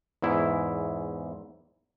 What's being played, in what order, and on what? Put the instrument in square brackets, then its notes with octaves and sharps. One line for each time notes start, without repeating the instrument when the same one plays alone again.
[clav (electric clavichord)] E2 G#2 E4